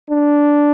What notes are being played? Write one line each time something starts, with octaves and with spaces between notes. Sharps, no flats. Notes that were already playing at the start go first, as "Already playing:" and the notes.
D4